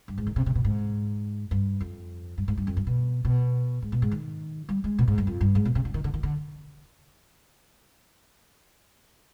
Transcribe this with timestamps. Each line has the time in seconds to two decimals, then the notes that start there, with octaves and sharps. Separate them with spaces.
0.08 G2
0.18 G#2
0.27 D#3
0.36 C3
0.46 C3
0.55 B2
0.65 G#2
1.51 G2
1.81 F2
2.38 G2
2.48 G#2
2.58 G2
2.67 F2
2.77 G2
2.87 B2
3.25 B2
3.82 G#2
3.92 B2
4.02 G#2
4.12 D#3
4.69 G3
4.84 G#3
4.98 B2
5.08 G#2
5.18 G2
5.27 F2
5.41 G2
5.55 G#2
5.65 B2
5.75 C3
5.85 D3
5.94 D#3
6.04 D3
6.14 D#3
6.23 D3